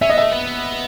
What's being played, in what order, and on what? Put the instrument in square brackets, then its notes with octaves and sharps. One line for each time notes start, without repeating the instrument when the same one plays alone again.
[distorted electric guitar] C#4 [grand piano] E5
[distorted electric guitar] B3 [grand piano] D#5
[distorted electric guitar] A3 [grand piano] E5
[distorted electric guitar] B3